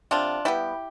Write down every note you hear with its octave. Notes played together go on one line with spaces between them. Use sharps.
C3 D4 F4
G3 B3 E4 G4